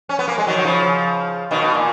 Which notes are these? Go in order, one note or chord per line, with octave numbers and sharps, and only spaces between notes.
C#4
B3
A#3
G#3
D#3 F#3
F#3
C#3 F3
B2 D#3
B2
A#2